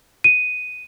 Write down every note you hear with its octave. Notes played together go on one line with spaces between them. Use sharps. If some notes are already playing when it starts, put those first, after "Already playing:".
D#7